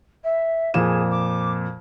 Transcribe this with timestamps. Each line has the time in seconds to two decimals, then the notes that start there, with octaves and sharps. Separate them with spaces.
0.23 E5
0.74 F2 A#2 G#4 E7
1.10 D6